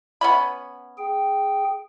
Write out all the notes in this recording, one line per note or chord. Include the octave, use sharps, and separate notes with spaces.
B3 C#4 B5
G#4 G5